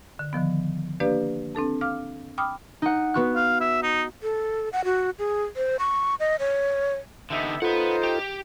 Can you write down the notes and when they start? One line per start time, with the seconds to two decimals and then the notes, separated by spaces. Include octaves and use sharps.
0.19 D3
0.33 D3 D#3 F3 B3
1.00 A#3 D4 G4 B4 D5 F5
1.55 C4 D4 A4 A5
1.81 F5 D6 F6
2.38 G5 B5 D6 D#6 F6
2.82 D#4 F#5
3.14 B3 F#4 F#6
3.36 F5
3.61 E5
3.83 D#4
4.23 A4
4.73 F#5
4.85 F#4
5.19 G#4
5.56 C5
5.79 C#6
6.20 D#5
6.39 C#5
7.30 D3 B3 D#4 G4 E5
7.62 D#4 F4 A4 B4 C5 F#5
8.03 G4